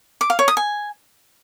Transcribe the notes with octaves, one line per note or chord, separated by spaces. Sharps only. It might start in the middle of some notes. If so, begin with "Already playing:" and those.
D6
F5
C#5
D#6
G#5